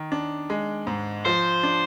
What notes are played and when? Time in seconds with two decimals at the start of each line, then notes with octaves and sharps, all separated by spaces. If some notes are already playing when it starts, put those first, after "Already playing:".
Already playing: D#3
0.12 D4
0.50 G#3
0.87 G#2
1.25 F3 C5
1.63 D4